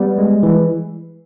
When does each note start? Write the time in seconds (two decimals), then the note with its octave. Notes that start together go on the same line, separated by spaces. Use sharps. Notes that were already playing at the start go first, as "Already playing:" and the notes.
Already playing: G3 B3
0.18 G#3
0.43 E3